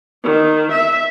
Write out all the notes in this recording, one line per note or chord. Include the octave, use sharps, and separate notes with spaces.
D#3
E5